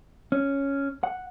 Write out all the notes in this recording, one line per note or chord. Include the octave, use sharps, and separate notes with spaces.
C#4
F#5